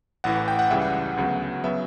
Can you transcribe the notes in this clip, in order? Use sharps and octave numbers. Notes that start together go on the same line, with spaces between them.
A1 A2 E3 F#5
G5
F#5
C#2 C#3 E3 G3 E5
F#5
D2 C#3 F#3 B3
C#3 F#3 B3 E5